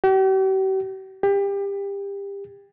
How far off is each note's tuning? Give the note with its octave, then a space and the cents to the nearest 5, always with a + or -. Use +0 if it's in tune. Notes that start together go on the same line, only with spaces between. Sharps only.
G4 -45
G4 +25